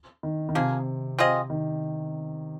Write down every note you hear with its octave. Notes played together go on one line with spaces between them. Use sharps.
D#3
D#3
C3 F3 A#3 G#4
C4 F4 G#4 D#5
D#3